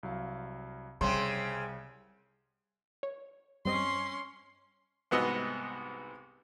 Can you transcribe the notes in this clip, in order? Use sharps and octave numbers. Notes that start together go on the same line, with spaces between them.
C2 F#3 F5
C2 C#3 G3 C4 C6
C#5
G2 C4 C#4 D#5 C6
C2 G#2 B3 F#4 D#5 E6